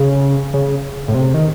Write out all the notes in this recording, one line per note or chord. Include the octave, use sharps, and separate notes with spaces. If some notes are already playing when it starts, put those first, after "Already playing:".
Already playing: C#3
C#3
A2
C3
D#3